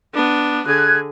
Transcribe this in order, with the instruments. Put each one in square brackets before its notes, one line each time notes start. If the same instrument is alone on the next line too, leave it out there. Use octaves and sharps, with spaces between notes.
[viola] B3 D4
[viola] D3 G#4 [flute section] F#6 G#6